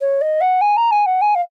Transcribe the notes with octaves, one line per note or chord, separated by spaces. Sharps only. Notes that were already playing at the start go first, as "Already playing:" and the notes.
C#5
D#5
F#5
G#5
A#5
G#5
F#5
G#5
F5